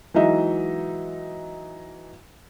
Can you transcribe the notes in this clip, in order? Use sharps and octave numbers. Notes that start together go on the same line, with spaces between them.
E3 F#3 G#3 D#4 D#5 E5